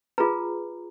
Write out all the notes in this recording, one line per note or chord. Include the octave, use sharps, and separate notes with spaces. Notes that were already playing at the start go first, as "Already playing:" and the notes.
F4 G#4 B4 A#5